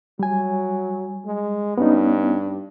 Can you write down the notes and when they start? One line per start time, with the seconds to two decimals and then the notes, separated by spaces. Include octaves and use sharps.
0.19 F#3 G3 G#5
1.25 G#3
1.78 G2 B3 C#4 D#4